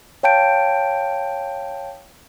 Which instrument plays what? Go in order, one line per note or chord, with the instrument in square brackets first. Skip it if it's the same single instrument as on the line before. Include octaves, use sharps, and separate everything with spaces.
[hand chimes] C#5 F5 G5 A5 G6 D7